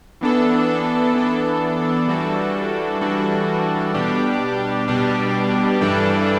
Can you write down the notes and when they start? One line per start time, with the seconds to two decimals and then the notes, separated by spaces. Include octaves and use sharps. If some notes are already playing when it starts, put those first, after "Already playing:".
0.21 E3 B3 D4 A4
1.14 E3 B3 D4 A4
2.08 E3 G3 D4 F#4 A4
3.01 E3 G3 D4 F#4 A4
3.94 B2 G3 D4 G4
4.88 B2 G3 D4 G4
5.81 G2 E3 G3 D4 A4